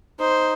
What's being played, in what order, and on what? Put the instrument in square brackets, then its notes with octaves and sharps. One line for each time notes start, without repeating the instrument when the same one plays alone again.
[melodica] D#4 [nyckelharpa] C5